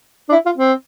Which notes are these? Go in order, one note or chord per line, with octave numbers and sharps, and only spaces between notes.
D4
E4
F4
C4